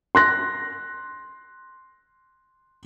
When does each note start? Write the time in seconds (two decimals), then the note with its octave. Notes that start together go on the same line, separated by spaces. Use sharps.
0.15 C6 F#6 A#6